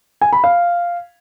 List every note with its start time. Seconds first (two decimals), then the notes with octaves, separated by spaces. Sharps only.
0.21 G#5
0.33 B5
0.44 F5